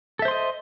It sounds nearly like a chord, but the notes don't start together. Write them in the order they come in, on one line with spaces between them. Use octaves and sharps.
A4 E5 C5 C6 D#5